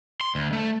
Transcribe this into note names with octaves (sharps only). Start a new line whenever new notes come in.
C6
D2
A3